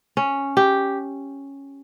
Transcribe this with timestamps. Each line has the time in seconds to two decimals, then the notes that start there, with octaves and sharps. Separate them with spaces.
0.17 C#4
0.57 G4